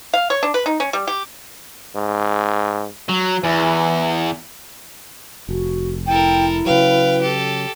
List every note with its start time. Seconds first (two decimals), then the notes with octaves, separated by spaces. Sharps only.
0.13 F5
0.30 C#5
0.43 D4
0.54 B4
0.66 D#4
0.80 C#4
0.93 G3
1.07 G4
1.96 G#2
3.09 F#3
3.44 E2 E3
5.49 F1 F#4
6.08 E4 A4 A#4 G5
6.66 C#3 F#3 B4 F5 G5
7.21 G4 A4